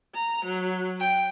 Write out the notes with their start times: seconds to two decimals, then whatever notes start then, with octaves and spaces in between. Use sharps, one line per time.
0.15 A#5
0.45 F#3
0.99 G5